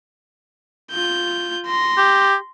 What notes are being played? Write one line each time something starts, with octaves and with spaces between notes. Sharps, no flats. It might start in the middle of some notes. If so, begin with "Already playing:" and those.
F4 G6
C6 A#6
G4